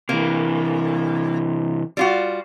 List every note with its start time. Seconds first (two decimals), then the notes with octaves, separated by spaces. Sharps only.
0.09 C3 E3 A#3
1.97 G3 F4 F#4